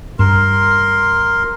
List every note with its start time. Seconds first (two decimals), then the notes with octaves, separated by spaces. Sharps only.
0.19 G2 A#4 C6